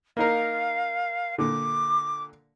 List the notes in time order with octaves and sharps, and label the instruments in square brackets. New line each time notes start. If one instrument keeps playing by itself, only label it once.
[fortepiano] A#3 D#4 A#4 [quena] F5
[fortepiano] A#2 D3 [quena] D6